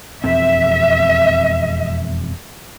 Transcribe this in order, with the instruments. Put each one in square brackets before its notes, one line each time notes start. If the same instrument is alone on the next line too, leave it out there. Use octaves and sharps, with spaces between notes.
[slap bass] E1 F2 C4 [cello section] E5